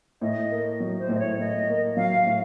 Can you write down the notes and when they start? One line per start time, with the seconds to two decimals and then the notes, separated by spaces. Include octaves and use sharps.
0.21 A2 D#5
0.50 A#3
0.80 F#3
0.99 C5
1.09 A2
1.15 D#5
1.19 C#5
1.39 A2 D#5
1.68 A#3
1.97 F#3 F5
2.27 A2